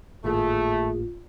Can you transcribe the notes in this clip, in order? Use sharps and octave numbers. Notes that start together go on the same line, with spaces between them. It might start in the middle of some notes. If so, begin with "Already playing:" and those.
G#1 A2 A3 A#3 F4 G#4